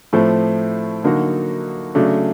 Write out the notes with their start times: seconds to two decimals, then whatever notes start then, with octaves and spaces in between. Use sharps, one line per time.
0.13 A2 F3 A3 C4
1.04 D3 F#3 A#3 D#4 F#4
1.95 C#3 F#3 A3 D4